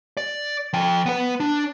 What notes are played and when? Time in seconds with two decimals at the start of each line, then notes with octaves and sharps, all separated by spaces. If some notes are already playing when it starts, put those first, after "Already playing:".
0.17 D5
0.73 F3 G5
1.06 B3 B4
1.40 D4